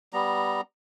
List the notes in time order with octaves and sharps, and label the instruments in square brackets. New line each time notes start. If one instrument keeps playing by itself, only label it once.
[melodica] G3 B3 A#5